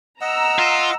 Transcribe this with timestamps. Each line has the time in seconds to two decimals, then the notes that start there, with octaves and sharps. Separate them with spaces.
0.21 D#5 F#5 A#5 E6
0.59 F4